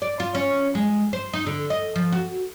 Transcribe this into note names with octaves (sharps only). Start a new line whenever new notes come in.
D5
F4
C#4
G#3
C5
D#4
D3
D#5
F3
F#4